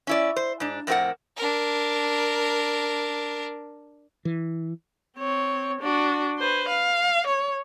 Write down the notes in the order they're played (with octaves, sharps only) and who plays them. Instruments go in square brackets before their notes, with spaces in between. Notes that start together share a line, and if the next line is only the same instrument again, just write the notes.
[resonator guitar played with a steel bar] C#4 E4 D5
C5
G#2 D4
F2 A2 C4 F4 A#4 F#5
[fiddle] D4 A#4
[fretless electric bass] E3
[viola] C4 C#5
D4 F#4
B4 C5
F5
C#5